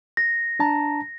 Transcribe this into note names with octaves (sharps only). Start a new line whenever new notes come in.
A#6
D4 A5 A#5